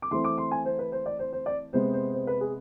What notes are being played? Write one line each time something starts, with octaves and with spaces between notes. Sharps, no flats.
D6
E3 A3 C4 C6
D6
C6
G#5
C5
B4
C5
D5
C5
C5
D5
C3 G#3 B3 C5
C5
C5
B4
G#4